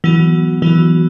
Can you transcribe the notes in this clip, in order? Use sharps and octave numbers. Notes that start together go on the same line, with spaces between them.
E3 F#3 B3 F#4
E3 F#3 B3 F#4